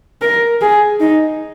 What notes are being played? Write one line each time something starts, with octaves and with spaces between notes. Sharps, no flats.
A#4
G#4
D#4